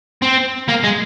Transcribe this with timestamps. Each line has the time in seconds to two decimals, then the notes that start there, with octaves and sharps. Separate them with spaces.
0.22 C4
0.68 A#3
0.83 G#3